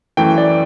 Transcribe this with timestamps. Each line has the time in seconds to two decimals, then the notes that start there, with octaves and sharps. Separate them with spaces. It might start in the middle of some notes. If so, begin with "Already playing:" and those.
0.17 F#2 E3 A3 G5
0.38 D5